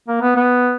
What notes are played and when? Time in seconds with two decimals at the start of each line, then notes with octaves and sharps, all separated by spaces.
0.08 A#3
0.21 B3
0.36 B3